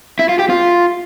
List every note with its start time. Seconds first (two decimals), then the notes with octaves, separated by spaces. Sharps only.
0.19 E4
0.29 F4
0.39 G4
0.50 F4